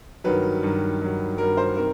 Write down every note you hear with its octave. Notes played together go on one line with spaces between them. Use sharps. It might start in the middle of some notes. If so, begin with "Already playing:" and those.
G2 D#3 F#3 B4
G2 D#3 F#3
G2 D#3 F#3
G2 D#3 F#3 A#4
C5
C3 D#3 A#4